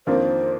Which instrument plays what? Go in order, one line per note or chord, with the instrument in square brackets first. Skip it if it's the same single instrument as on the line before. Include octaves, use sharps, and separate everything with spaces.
[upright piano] F2 D#3 A#3 D4 F4 [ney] C5